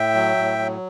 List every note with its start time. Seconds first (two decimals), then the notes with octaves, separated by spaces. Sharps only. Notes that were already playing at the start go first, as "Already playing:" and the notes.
Already playing: A2 E5 G5
0.14 F#3
0.37 A2
0.59 F#3